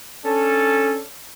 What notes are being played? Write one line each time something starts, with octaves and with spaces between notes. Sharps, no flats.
C#4 D4 A4